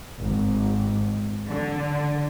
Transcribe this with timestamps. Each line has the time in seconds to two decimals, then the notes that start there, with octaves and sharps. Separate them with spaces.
0.20 G#1
1.48 D3